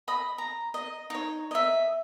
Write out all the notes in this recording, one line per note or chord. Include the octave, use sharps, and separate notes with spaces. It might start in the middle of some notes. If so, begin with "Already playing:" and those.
D#5 B5 D#6
A#5
D#5
D#4 C#5
D#5 E5